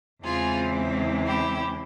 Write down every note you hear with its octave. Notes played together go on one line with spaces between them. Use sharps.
E2 C#3 E3 G#3 C4 F4 G#4
E4 G4